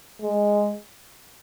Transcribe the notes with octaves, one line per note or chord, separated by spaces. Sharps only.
G#3